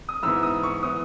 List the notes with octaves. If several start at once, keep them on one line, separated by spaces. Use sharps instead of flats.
D#6
G#2 E3 B3 E6
D#6
C#6
E3 B3 D#6